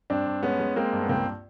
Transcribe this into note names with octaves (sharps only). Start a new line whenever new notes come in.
G2 C4 D4
G2
G#3 B3 C#4
G#3
G#3 A#3 C4
G2
B3
C#2 A#3 C4